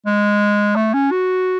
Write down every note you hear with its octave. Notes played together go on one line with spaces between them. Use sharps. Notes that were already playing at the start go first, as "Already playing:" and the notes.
G#3
A3
C#4
F#4